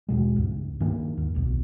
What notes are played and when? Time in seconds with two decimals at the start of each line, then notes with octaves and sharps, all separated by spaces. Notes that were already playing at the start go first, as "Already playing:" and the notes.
0.09 D#2 B2 G#3
0.36 C#2 G2
0.80 G2 D#3 A#3
1.17 D#2
1.35 D1 B1